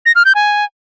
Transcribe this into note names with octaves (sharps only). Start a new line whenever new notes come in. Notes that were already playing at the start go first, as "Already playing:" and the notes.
A#6
F6
G6
G#5